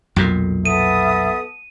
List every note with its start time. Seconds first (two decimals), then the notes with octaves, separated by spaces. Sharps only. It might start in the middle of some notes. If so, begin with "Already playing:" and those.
0.16 B1 F2 A#2
0.65 B3 A4 E5 D#6 D#7